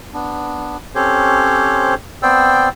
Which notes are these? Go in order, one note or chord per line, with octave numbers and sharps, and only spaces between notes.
B3 D4
C4 C#4 G4 A4 C5 C#5
B3 C4 C5 D5 G5 E6